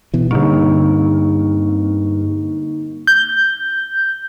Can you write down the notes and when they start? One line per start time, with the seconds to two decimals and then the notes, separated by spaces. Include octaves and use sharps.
0.14 B2 E3
0.31 G2 D3 A#3 C4 D#4 C#6
3.07 G6